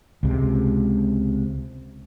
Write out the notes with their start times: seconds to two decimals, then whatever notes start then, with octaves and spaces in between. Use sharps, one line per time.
0.23 C#2 C3 G#3